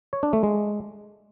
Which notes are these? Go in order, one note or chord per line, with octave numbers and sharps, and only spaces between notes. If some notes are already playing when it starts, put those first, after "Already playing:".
C#5
D4
A3
G#3